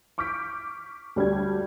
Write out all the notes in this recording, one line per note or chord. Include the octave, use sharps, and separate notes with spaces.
C#6 D6 F6 G6 B6 D7
D2 G3 D4 G#6